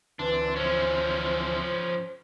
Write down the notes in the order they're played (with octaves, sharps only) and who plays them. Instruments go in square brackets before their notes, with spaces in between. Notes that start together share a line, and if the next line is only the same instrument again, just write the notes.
[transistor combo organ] D2 E3 C4 [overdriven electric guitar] D4 [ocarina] B4
[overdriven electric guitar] F3 C#4 [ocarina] C5